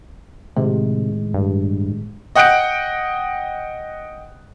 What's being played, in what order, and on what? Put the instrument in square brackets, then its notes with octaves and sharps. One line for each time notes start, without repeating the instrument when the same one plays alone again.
[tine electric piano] A2 D#3 G#3 [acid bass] C3
[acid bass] G2
[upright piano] D#5 F#5 G5 F#6 G6 D7